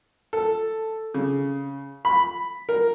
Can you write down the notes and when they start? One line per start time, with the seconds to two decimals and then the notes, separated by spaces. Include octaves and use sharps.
0.33 A4
1.14 C#3
2.05 B5
2.69 A#4